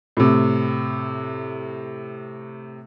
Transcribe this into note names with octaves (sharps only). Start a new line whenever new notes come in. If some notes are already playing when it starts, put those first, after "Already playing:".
A2 C3